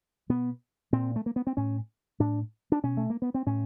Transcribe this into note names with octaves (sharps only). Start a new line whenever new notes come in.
B2 B3
A#2 C4
A3
A#3
B3
C4
A2 C#4
A2 D4
D4
B2 C#4
A3
A#3
B3
C4
A2 C#4